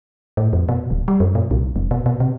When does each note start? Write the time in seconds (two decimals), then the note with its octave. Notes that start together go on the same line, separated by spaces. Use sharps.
0.37 A2
0.53 F2
0.69 B2
0.90 D1
1.08 G3
1.20 F#2
1.35 A#2
1.51 C2
1.76 F1
1.91 B2
2.06 B2
2.20 C3